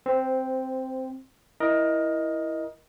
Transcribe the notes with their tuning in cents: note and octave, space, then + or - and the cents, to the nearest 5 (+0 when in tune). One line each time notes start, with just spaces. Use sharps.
C4 +0 C5 -15
E4 +0 A#4 +20 D#5 +0